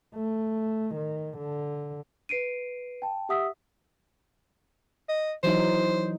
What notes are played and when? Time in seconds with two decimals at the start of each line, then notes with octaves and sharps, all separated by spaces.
0.16 A3
0.95 D#3
1.38 D3
2.29 B4 C7 D7 D#7
3.02 G5 A5
3.29 G4 E5 F#5 D#6 E6 B6
5.09 D#5
5.44 E3 F#3 D#4 C5